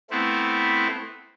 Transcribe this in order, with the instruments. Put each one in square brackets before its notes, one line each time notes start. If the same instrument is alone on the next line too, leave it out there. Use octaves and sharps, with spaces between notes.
[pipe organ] A3 B3 C4 E4